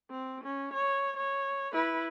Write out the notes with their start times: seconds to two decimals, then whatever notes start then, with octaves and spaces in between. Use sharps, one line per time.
0.10 C4
0.44 C#4
0.73 C#5
1.17 C#5
1.73 E4 B4